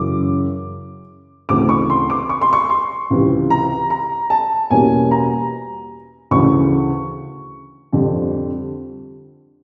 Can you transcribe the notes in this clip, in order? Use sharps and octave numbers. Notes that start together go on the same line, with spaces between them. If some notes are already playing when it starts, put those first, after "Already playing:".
Already playing: F#2 C#3 E3 D6
D2 C#3 E3 A3 C4 D6
C#6
C6
D6
C#6
C6
C#6
C6
C#2 C3 E3
A#5
A#5
A5
E2 B2 G3 A#3 C#4 G#5
A#5
D2 C#3 E3 C#6
F2 D3 G3 C4